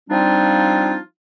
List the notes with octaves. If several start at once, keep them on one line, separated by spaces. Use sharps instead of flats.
F3 G3 C4 D4 D#4 F4